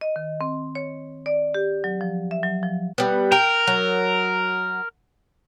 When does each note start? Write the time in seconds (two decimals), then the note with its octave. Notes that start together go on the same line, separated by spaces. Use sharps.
0.01 D#5
0.16 D#3
0.41 C4
0.75 C#5
1.26 D5
1.54 G4
1.84 F#3
2.01 F3
2.31 E5
2.43 F#3
2.63 F3
2.98 G3 B3
3.32 A#4 G5
3.67 F#3